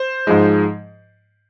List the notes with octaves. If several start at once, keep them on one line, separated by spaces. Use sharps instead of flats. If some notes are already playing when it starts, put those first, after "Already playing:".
Already playing: C5
G#2 F3 G#3